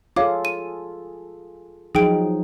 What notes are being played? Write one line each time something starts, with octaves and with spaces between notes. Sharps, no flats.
F4 G#4 A4 C#5 F5 D6
D#7
F3 F#3 D#4 G#4 G5 D7